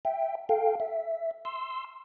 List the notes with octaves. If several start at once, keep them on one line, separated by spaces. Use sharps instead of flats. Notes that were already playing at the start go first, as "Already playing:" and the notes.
E5 G5
A4 F5 G5
E5
C6 E6